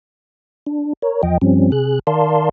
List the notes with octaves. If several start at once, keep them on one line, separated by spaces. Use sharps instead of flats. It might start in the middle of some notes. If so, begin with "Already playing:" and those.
D4
A#4 C#5
E2 F3 D#5 G5
G2 F3 G3 C4 C#4
C3 G#4 F#6
D#3 A#4 D5 F5 A5 C6